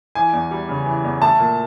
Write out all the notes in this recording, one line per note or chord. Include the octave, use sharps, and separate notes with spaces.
E3 G#5
E2
G3
C#3
E3
E2
A3 A5
A#2